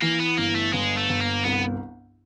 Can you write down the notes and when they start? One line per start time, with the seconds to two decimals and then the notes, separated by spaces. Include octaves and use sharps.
0.02 E3 A#3
0.19 B3
0.38 G1 A#3
0.55 A3
0.73 G1 G#3
0.97 A3
1.09 G1
1.21 A#3
1.44 C2 B3